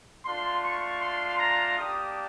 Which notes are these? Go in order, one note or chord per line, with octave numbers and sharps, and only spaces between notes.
A3 D4 F4 C6
C#6
C6
A#5
A#3 D4 G4 D#6